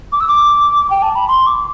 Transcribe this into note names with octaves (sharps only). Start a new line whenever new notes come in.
D6
E6
D6
G5
A5
B5
C6
D6